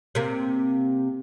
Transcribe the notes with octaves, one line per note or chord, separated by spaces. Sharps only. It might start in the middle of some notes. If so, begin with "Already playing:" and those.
C3 A#3